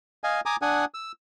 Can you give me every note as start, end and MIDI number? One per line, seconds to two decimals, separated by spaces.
0.24 0.41 75
0.24 0.41 77
0.24 0.41 80
0.46 0.56 80
0.46 0.56 82
0.46 0.56 86
0.46 0.56 87
0.62 0.85 62
0.62 0.85 78
0.62 0.85 80
0.62 0.85 87
0.94 1.12 88